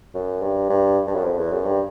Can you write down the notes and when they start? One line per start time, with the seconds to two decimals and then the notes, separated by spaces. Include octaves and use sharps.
0.15 F#2
0.42 G2
0.70 G2
1.07 G2
1.15 F#2
1.24 F2
1.38 E2
1.52 F#2
1.65 G2